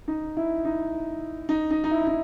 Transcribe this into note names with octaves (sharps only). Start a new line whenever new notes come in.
D#4
E4
D#4
D#4
D#4
D#4
E4
D#4